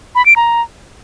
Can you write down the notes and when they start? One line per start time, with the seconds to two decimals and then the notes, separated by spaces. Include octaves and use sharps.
0.15 B5
0.26 D7
0.36 A#5